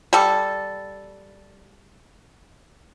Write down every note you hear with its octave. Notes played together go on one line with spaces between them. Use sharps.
G3 A4